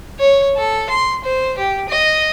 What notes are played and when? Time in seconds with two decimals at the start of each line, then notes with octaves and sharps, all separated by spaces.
0.19 C#5
0.56 A4
0.90 C6
1.24 C5
1.58 G4
1.89 D#5